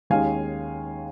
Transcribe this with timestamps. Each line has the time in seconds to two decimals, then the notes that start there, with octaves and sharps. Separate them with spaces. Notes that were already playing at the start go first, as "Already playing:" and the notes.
0.10 D#2 D#3 G#3 C#4 F5 G#5